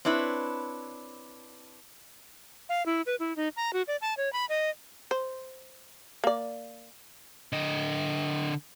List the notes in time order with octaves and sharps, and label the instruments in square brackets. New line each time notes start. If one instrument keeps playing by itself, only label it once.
[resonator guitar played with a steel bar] C4 D4 E4 B4 C#5
[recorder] F5
E4
B4
E4
D#4
A#5
F#4
D5
A5
C#5
B5
D#5
[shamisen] C5
A#3 D5
[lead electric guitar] D3 D#5